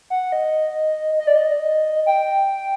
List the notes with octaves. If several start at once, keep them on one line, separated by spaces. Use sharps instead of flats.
F#5
D#5
D#5
D5
D#5
G5